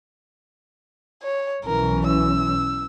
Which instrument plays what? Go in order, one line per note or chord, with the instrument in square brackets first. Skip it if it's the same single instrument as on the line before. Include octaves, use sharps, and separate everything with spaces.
[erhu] C#5
[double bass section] B1 E3 C#4 [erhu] A#4
[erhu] E6